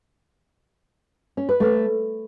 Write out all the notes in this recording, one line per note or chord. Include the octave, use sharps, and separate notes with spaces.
C#4
B4
A3